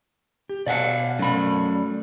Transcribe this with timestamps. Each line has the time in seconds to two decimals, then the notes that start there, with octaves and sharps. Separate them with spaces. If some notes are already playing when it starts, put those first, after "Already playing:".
0.49 G4
0.67 B2 D5 F5 F#5
1.19 F#2 A3 D5 B5